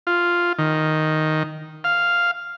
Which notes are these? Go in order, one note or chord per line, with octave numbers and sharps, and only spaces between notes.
F4
D#3
F5